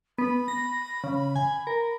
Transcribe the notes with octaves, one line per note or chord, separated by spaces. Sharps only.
B3 B5
A#6
C#3
G#5
A#4